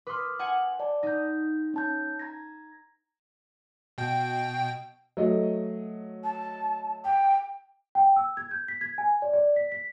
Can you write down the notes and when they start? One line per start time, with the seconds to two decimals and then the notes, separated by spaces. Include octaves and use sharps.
0.07 B4 C6 D6 D#6 F6
0.39 F#5 G#5 C#7
0.80 D5 A5
1.03 D#4 G6 A#6
1.74 C#4 A5 G6
2.19 A#5 G#6 A#6
3.98 B2 G5
5.17 F#3 A3 D#5
6.24 A5
7.04 G5
7.95 G5
8.16 E6
8.37 G#6
8.51 G6
8.68 B6
8.81 G#6
8.98 G#5
9.22 D5
9.33 D5
9.56 B6
9.72 B6